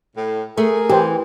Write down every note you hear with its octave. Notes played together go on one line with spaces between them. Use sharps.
A2
A3 G#4 A#4
E3 G4 C5